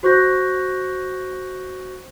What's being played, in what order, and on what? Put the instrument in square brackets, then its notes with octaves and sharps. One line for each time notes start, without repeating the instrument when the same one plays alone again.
[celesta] F#4 C5 C#6 F#6 G6 A#6